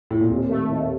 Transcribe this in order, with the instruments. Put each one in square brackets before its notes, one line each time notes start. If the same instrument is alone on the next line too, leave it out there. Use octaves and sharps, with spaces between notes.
[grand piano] A2
A#2
[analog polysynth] D#2 [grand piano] C3
[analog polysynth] A3
D#2